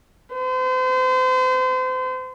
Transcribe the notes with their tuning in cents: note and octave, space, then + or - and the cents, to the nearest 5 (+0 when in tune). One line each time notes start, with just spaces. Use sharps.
C5 -35